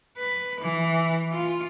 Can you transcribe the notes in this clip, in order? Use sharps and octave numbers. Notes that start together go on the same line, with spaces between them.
B4
E3
F4